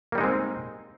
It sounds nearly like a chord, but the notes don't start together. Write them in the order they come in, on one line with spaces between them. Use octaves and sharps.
A#3 G3 D#4 G#3 C4